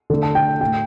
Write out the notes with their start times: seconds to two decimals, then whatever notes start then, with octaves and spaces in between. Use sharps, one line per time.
0.10 D3 A3 A4
0.23 A5
0.35 G5
0.61 A2 A3 G5